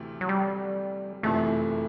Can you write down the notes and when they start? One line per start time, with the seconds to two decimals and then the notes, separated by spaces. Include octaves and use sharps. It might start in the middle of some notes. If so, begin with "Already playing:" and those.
Already playing: D2 C3 E3 A3
0.21 F#3
0.29 G3
1.23 F#1 F2 C3 E3 A3